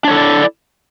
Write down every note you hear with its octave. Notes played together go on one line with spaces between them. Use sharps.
D4 E4 A4 C#5 D5